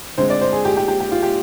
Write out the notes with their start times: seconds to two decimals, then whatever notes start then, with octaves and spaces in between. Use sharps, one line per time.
0.18 D3 G#3 C4 C5
0.30 D5
0.41 C5
0.52 G#4
0.65 G4
0.77 G4
0.88 G4
1.00 G4
1.11 F4
1.23 G4